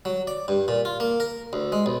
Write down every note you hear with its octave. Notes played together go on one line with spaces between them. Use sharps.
F#3
D5
G2
A#2
F4
A#3
A#4
D2
G#3
B1